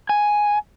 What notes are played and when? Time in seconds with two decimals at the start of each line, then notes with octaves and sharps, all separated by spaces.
0.09 G#5